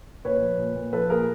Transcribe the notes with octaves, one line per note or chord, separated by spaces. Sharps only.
A#2 B4 C#5
F3
A#2
A#2
F3 A4 B4
A#2 G#4 A#4